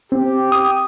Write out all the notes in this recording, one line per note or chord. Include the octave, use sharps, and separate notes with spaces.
C4 G4
D#6